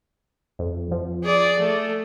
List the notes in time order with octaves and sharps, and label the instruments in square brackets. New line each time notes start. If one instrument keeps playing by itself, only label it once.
[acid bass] F2
F3
[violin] G#4 D5
A3